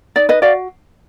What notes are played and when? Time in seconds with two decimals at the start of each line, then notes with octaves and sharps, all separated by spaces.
0.16 D#4 D5
0.29 B4 D#5
0.42 F#4 D5 F5